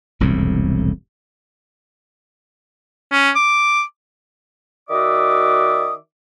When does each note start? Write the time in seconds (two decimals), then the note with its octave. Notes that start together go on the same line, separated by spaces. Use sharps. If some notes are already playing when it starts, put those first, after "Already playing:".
0.20 E1 C2 F2 A2
3.11 C#4
3.35 D6
4.89 D#3 F#4 D5 E5 D6 D#6